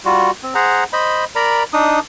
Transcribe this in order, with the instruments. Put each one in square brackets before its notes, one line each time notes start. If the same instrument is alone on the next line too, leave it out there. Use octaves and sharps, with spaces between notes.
[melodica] G3 F4 F#4
C4
G#4 C5 F#5 A#5
C5 D#5 B5
A#4 D5 A#5 B5
D4 D#4 D#6